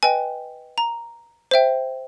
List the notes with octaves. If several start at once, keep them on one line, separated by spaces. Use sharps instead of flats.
B4 D#5 G5 G#5
A#5
C5 E5 G5